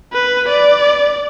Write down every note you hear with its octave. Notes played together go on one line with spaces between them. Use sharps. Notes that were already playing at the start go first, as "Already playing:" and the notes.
B4
D5